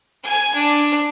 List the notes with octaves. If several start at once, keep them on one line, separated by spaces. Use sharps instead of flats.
G#5
D4